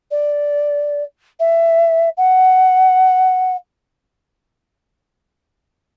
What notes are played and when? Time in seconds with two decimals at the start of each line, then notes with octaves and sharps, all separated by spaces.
0.11 D5
1.39 E5
2.17 F#5